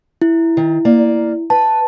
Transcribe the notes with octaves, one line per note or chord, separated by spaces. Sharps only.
E4
D#3
A#3 D5
B4 A5